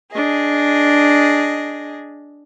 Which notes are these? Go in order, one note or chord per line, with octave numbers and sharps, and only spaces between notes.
D4 G#4 D#5